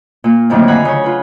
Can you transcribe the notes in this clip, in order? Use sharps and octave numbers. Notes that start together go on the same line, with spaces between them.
A#2 A#3
F2 A2 D3 D#3 F#3 A#3
F5 F#5 G#5 A#5 B5 F#6
C#3 C#5
F4 B4